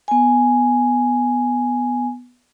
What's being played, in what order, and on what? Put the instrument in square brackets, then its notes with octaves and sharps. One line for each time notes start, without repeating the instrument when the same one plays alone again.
[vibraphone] B3 G#5